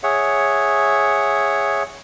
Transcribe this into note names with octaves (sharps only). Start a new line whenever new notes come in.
G#4 C#5 E5 F#5